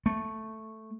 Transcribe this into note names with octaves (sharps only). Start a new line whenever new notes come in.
A3